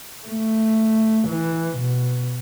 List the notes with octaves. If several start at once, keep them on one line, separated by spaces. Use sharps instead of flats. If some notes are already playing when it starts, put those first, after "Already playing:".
A3
E3
B2